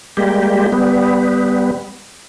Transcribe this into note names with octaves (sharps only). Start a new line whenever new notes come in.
G3 G#3 A#3 G4
G3 B3